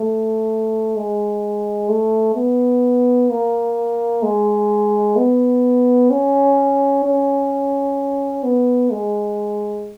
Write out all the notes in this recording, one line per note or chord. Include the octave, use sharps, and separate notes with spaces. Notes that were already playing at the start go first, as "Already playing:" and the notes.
Already playing: A3
G#3
A3
B3
A#3
G#3
B3
C#4
C#4
B3
G#3